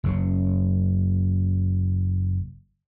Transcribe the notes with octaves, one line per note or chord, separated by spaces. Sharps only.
F#1 C#3